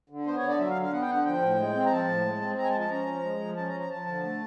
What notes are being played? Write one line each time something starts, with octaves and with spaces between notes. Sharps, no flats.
D3
B3 C5
C#5
D3
D5
F#3 E5
F5
D3
F5
B3 F#5
G5
D3 F#5
F3 G5
A2
G#3
C4
A#5
F3 A5
A2
G#3
C4
G#3 A#5
G#5
A5
F3
A5
C#4 A#5
F3
G#3
F3
C#4 A5
A#5
F3
A#5
F3 A5
D3
A3